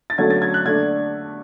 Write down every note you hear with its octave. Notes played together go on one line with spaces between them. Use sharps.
A6
D3 F#3 A3 C#4 G#6
A6
G#6
F#6
D3 A3 D4 G#6